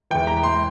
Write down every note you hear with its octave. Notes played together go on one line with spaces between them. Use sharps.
E2 E3 G5
A#5
C6